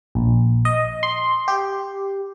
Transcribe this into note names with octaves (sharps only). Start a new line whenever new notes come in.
A#1
D#5
C6
G4